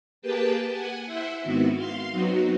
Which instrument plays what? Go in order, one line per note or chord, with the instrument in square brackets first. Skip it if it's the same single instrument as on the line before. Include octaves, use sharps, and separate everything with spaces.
[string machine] A#3 G4 G#4 B4 G5 A5
F#5 G#5
E4 C5 E5 F#5
G#2 D#3 B3 C4 E4 F#4
F5 C6
F#3 B3 C4 D#4 F#4